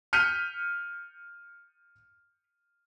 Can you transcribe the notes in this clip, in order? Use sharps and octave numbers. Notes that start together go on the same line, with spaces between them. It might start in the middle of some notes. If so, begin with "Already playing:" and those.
F6 G6 B6 C#7 D#7